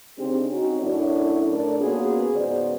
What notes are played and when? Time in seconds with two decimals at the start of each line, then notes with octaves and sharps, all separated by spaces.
0.17 C#3 G#3 C4 D4 D#4 G4
0.50 C4 C#4 D#4 F#4
0.81 F#2 A3 C#4 D4 E4 C#5
1.48 A2 A3 D4 A#4 D5
1.79 A#3 B3 C#4 F4 F#4 G#4
2.34 G#2 C#3 F#3 B3 C5 D5